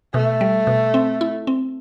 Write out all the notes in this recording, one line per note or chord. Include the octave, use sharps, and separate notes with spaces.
B2 A3
G3
B2
C4
E4
C4